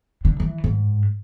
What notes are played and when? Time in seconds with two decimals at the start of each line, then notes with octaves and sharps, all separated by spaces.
0.25 D3
0.40 E3
0.64 G#2